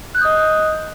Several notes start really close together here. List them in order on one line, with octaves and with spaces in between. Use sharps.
F#6 G6 D#6 D#5